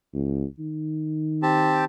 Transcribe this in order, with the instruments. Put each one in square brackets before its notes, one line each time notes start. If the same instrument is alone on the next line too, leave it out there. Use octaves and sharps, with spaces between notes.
[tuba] C#2
D#3
[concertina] C4 G4 A5